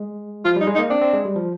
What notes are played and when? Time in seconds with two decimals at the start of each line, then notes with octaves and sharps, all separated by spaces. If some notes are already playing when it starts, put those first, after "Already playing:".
Already playing: G#3
0.45 F3 F4
0.56 G3 D#4
0.67 G#3
0.75 D#4
0.79 A#3
0.90 C4 D4
1.01 C4
1.13 G#3
1.25 G3
1.36 F3